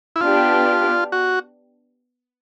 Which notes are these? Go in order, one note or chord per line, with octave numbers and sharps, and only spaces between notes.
E4
B3 D4 F4 G4
F#4